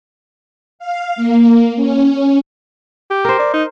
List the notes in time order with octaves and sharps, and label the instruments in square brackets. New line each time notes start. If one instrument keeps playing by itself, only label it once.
[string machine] F5
A#3
C#4
[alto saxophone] G4
[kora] A#4 C5
[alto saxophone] D5
D#4